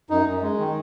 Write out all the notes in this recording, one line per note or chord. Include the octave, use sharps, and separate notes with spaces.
F#2 D#4
F#2
G#3
D#3